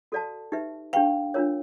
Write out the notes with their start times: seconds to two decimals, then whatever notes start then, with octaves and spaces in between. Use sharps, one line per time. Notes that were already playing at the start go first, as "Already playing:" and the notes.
0.12 F#4 A4 D5 F5 A5
0.52 D#4 G4 B4 E5
0.93 D4 G4 B4 F5 G5
1.34 D4 F4 A#4 C#5